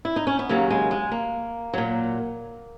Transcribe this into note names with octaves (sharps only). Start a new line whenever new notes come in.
E4
D#4
C#4
B3
D#2 C#3 F#3 A#3
G#3
G#3
A#3
A#2 F#3